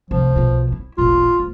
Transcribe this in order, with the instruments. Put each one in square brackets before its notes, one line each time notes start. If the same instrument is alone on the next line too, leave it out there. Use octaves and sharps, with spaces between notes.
[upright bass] C2 A3 [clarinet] F3
[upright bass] B1 F4
E4
[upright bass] D#1 A1 [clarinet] F4
[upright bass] D2